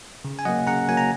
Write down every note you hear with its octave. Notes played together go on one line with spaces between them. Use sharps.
C#3
G#5
F#3 A#3 D#5 F#5
C#3 F#5 A#5
F#3 A#3 G#5
A#5